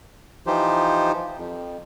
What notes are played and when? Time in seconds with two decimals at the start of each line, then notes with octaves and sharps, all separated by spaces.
0.47 E3 F3 D#4 F4 G4 C5
1.38 F2